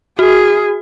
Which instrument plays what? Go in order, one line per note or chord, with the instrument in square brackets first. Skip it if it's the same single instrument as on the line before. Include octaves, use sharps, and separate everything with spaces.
[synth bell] F#4 [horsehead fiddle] G#4